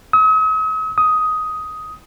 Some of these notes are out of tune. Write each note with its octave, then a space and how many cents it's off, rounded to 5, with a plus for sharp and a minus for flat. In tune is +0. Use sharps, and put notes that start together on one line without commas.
D#6 +45
D#6 +10